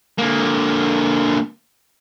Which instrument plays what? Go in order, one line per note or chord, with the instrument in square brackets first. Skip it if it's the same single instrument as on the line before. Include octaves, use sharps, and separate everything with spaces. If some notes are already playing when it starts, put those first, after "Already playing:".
[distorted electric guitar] D3 A#3